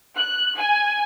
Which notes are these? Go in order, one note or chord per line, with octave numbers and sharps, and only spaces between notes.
F#6
G#5